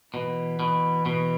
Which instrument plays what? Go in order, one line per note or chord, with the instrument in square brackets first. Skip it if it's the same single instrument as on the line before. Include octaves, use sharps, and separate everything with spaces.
[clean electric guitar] B2 [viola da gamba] E3
[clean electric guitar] B2
B2